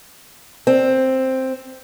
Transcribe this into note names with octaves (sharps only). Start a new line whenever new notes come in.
C4